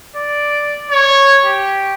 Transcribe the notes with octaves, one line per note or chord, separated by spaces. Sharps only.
D5
C#5
G4